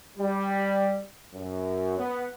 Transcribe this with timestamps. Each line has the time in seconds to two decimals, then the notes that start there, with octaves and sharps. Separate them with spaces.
0.17 G3
1.32 F#2
1.98 B3